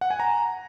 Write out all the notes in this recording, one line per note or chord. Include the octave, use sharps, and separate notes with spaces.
F#5
G#5
A#5